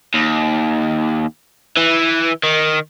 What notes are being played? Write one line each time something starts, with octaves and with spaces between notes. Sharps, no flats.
D#2
E3
D#3